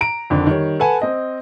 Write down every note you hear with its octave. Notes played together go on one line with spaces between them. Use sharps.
A#5 D7
F2 D3 D#3 D4
D#3 G3 C#5
A4 B4 F#5 G#5 A5
C4 D#5